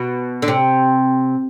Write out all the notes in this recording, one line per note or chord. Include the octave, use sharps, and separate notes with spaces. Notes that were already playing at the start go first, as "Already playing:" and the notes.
Already playing: B2
D3
C3